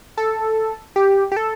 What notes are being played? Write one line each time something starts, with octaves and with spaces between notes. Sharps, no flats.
A4
G4
G4
A4